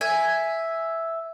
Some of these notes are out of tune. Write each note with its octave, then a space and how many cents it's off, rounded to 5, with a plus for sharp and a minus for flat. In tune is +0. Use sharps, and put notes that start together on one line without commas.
E5 +0 G#5 +0